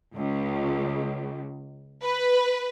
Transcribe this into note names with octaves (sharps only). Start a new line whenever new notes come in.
C#2
B4